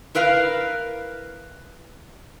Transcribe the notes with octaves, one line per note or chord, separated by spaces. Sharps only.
E4 A#4 B4 F5